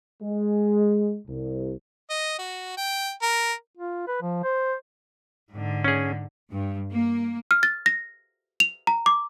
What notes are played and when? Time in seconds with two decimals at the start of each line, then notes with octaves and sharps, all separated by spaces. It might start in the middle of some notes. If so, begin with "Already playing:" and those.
0.22 G#3
1.27 C2
2.10 D#5
2.39 F#4
2.77 G5
3.22 A#4
3.77 F4
4.08 B4
4.22 F3
4.44 C5
5.52 G#2 D3
5.84 C#4 G#4
6.52 G2
6.93 A#3
7.51 F6
7.63 A6
7.86 A#6
8.60 F7
8.87 A#5
9.06 D6